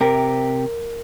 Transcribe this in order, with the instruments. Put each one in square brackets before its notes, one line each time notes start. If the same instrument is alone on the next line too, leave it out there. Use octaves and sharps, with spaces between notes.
[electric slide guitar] C3 G4 [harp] A#4